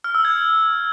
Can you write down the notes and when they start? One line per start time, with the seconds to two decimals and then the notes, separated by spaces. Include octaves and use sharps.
0.04 F6
0.15 E6
0.25 G#6